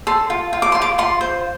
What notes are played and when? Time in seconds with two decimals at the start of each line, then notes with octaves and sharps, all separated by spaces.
0.07 A4 C6
0.30 F4
0.53 F4
0.62 D6
0.72 F4 C6
0.82 D6
0.98 F4 C6
1.21 C5